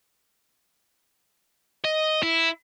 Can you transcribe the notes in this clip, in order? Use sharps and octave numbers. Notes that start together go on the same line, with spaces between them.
D#5
E4